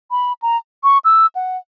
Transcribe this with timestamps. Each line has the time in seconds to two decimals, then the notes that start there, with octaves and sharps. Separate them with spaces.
0.11 B5
0.42 A#5
0.84 C#6
1.05 E6
1.35 F#5